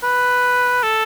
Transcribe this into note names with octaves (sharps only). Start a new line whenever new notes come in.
B4
A4